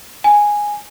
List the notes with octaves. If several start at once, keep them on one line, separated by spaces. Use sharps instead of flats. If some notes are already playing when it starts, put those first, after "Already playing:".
G#5